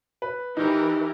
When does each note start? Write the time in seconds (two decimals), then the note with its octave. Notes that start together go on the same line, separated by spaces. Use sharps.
0.22 B4
0.57 E3 D#4 G4 A#4